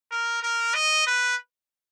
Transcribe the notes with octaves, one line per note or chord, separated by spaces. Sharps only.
A#4
A#4
D#5
B4